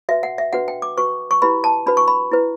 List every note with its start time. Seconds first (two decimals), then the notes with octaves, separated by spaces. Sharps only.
0.09 F#4 B4 E5
0.23 F#5
0.38 E5
0.53 D4 F#4 B4 F#5
0.68 G5
0.82 D6
0.97 F#4 B4 C#6
1.31 C#6
1.42 E4 G4 B4 B5
1.64 A5
1.86 D4 F#4 B4 B5
1.97 C#6
2.08 B5
2.32 E4 B4